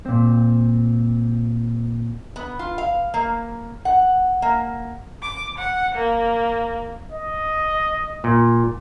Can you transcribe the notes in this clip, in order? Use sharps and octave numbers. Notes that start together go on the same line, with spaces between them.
A#2 C4
B3
F4
F5
A#3
F#5
A#3
D6
F#5
A#3
D#5
A#2